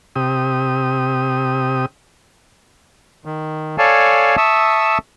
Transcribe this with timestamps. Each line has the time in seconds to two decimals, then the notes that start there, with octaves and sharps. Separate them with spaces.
0.16 C3 G4 D#6
3.26 D#3
3.78 A4 C#5 D5 F5 G#5 A5
4.37 E5 A5 C#6 D#6 E6